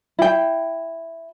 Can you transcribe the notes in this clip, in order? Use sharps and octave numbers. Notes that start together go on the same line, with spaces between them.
E4 G5